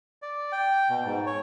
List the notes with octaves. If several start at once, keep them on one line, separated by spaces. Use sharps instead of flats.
D5
G5
B2
G#2
C#5